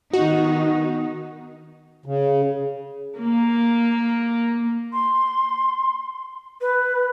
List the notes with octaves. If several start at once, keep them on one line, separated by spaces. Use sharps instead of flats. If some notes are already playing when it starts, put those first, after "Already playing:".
D#3 B3 D#4 F#4
C#3
A#3
C6
B4